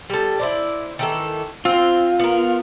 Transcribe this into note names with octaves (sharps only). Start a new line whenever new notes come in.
G3 A4
E4 C5 D5
D#3 E3 A4
C4 F4
B3 A#4